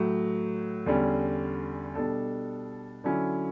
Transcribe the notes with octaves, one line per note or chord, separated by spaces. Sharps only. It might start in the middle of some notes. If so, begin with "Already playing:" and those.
Already playing: A2 F#3 A3
E2 D3 G3 C#4
B2 G3 D4 A4
D3 F#3 C#4 E4